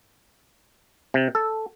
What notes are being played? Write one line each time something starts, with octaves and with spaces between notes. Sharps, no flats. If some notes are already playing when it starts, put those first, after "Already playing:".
C3
A4